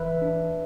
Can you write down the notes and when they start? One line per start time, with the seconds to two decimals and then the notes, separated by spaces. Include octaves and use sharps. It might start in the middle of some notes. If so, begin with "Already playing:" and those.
Already playing: E3 B4 E5
0.22 D4